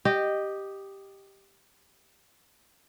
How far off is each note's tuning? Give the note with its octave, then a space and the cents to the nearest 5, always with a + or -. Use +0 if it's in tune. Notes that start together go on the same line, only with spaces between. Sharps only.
G4 +0 D#5 -10